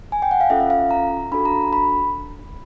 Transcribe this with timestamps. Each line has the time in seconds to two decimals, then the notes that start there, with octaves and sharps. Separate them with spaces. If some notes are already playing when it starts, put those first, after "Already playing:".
0.12 G#5
0.22 G5
0.31 F#5
0.41 F5
0.50 C#4 F4 A4 E5
0.60 E5
0.70 F5
0.91 A#5
1.32 D4 F#4 A4 B5
1.45 A#5
1.73 B5